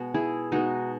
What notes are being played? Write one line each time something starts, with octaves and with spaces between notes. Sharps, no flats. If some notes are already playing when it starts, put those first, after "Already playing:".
Already playing: B2 G#3 B3 F#4
E4 G#4
B2 G#3 B3 D#4 F#4